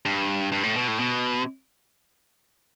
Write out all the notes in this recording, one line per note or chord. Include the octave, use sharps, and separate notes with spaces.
G2
G2
A2
B2
A2
B2